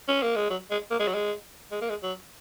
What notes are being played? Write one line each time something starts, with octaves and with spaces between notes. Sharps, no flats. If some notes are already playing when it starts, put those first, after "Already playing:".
C#4
A#3
G#3
F#3
G#3
A#3
G#3
F#3
G#3
G#3
A#3
G#3
F#3